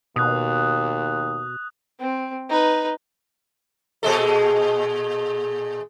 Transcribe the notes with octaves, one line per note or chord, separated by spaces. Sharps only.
D#2 B2 D#6 F#6
C4
D#4 B4
A#2 G#3 A4